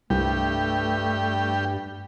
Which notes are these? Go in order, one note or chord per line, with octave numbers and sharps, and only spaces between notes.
C2 G2 G3 A3 G4